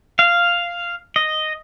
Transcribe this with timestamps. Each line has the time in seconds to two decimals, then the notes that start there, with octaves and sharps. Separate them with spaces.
0.19 F5
1.16 D#5